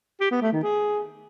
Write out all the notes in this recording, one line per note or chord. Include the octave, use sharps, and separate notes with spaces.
G4
B3
A3
D#3
G#4